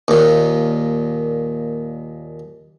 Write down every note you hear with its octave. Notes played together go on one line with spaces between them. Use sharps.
D#2 A#2